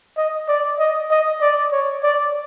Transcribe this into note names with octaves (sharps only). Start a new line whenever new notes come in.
D#5
D5
D#5
D#5
D5
C#5
D5